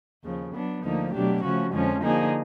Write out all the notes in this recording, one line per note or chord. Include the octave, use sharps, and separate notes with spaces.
D#2 C#3 F3
F#3 B3 D4
D2 D3 F3 A#3 D#4
B2 F#3 A3 D4 G4
C#3 F3 A3 C#4 F#4
F2 D3 F3 G#3 C#4
D3 F3 A#3 D#4 G#4